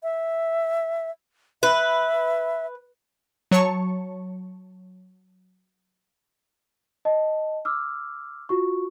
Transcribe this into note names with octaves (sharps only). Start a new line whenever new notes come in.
E5
B4 E5
F#3 C#5 A5 C#6 C#7
D#5 A5
D6 E6 F6
F4 F#4 C#6